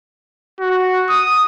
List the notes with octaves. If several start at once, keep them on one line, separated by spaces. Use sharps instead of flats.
F#4
D#6